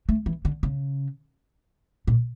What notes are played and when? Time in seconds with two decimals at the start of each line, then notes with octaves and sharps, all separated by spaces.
0.09 A3
0.26 E3
0.45 D3
0.63 C#3
2.07 A#2